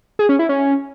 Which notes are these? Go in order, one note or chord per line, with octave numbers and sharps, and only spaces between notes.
G#4
C#4
E4
C#4